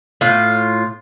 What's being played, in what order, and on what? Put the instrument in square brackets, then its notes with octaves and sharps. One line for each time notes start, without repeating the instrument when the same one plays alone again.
[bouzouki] A2 F4